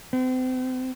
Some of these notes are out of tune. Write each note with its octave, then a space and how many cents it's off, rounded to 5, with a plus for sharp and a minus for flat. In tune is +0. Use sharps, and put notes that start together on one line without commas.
C4 -35